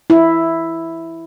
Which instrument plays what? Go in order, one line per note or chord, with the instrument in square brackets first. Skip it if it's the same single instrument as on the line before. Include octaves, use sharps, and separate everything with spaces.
[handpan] E4